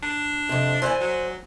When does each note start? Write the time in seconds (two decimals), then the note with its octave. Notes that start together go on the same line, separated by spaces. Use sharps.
0.03 D4
0.49 F2 C3
0.82 E3 C5 D5 G#5
1.00 F#3